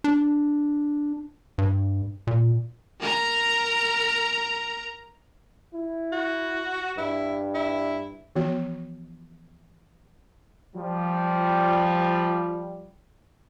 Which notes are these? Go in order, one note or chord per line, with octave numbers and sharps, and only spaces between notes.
D4
G2
A#2
A#4 A#5
E4
F#4
G2 E4
E4
E3 F3 B3 F#4 C#5
F3 G3